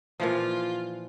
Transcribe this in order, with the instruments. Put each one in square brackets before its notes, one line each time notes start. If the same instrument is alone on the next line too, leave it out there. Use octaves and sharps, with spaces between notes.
[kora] A#2 E3 F3 [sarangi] F4